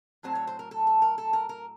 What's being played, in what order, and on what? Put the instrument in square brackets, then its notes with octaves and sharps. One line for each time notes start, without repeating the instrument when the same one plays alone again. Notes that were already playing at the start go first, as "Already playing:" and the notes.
[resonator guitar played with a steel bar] A2 F#3 A3 C4 C5
C#5
C5
A#4
A4
A4
A#4
A4
A#4
A#4